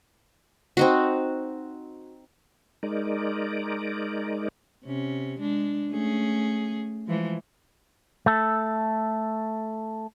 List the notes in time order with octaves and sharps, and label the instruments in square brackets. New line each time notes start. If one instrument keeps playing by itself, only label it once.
[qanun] C4 D#4 F#4
[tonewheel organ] G#3 D#4 A#4 D5
[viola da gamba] C3 C#4
G#3 D4
A3 C#4 G#4
E3 F3 G#3
[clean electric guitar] A3 A4